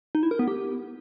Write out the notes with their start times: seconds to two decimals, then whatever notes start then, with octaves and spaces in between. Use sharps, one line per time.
0.15 D#4
0.23 E4
0.31 A#4
0.39 B3
0.48 G4